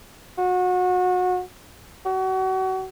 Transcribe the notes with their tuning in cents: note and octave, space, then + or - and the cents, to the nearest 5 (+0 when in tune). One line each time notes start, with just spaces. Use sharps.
F#4 -30
F#4 +30